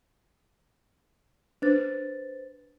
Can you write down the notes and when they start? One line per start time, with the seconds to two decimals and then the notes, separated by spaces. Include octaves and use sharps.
1.62 D4 B4 C5 A6